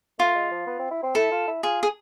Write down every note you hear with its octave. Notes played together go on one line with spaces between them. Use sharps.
A3 F4
G#3
F3
B3
C4
E4
C4
E4 A4
F4
E4
F4 G#4
G#4